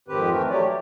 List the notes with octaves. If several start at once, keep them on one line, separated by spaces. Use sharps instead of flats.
F2 G#2 D#3 C4 G4 B4
E3 A3 A#4
F#3 A3 G4 C#5 D5
G4